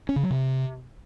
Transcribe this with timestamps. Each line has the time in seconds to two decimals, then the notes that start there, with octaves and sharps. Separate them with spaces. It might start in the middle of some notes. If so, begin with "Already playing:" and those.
0.09 C#4
0.16 C#3
0.23 F#3
0.30 C3